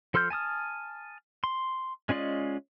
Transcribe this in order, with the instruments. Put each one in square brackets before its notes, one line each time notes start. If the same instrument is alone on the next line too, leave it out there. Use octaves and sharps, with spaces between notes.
[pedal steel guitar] F3 A4 C6 F6 G6
G#5 A5 D#6 F6
C6
G#3 C#4 F4 D5 D#5